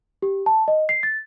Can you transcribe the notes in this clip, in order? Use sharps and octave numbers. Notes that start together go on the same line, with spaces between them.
G4
A5
D#5
C7
A6